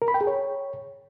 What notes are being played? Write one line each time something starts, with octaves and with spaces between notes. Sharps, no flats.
A#4
B5
G5
G#4
C#5